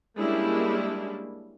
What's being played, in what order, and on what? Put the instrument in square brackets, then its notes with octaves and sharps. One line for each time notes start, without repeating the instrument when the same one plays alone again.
[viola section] G3 G#3 A#3 C#4 D4 E4